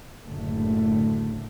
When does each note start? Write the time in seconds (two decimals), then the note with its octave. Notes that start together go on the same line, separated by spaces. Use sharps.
0.24 F#1 A2 D3 A3